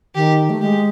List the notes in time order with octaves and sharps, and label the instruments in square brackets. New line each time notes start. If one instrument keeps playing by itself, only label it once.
[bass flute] D#3 [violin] G4
[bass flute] A3
[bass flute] G#3 [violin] G4